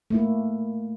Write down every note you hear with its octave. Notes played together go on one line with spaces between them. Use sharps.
A3 A#3 E4